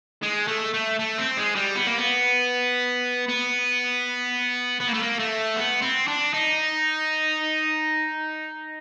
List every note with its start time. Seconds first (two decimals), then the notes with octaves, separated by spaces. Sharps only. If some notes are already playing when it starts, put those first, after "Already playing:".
0.22 G#3
0.47 A3
0.74 A3
0.99 A3
1.18 C4
1.37 G#3
1.56 G3
1.76 B3
1.87 A#3
1.98 B3
3.28 B3
4.81 B3
4.88 A#3
4.94 A3
5.02 A#3
5.19 A3
5.57 B3
5.82 C4
6.08 D4
6.34 D#4